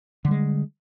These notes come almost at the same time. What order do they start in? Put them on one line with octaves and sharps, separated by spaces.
D3 G3 G#3